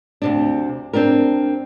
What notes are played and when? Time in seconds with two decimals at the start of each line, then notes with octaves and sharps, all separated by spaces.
0.22 D2 C3 D4
0.93 C4 D4 G4 A#4